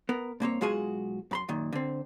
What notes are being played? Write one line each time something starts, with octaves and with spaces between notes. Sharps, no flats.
B3 A#4
G2 A#3 C4 C#5
B1 G#3 F4 F#4 G#4 G#5
F#2 B5 C6
F#2 A#2 D#3
D3 C4